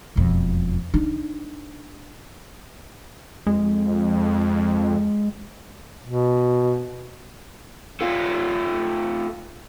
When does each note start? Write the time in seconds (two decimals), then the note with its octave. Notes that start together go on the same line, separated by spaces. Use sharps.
0.16 E1 F2
0.94 D4 D#4
3.47 F2 G#3
6.05 B2
8.01 A3 F4